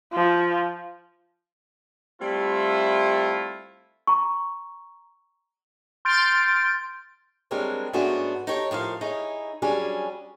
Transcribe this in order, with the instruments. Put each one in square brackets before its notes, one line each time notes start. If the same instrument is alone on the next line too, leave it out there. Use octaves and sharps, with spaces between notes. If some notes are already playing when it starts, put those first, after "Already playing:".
[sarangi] F3
[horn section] G3 A3 C4 E4 F4
[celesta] A#5 C#6
[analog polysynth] C6 F6 G6 A6 D7
[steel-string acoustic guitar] G3 G#3 C4 D4 A#4 C#5
G#2 A3 B3 C#4 D4 F#4
D#4 G4 A4 C#5
A2 F3 A#4 F5
D#4 E4 G#4 C#5
F#3 G3 C#4 D4 G#4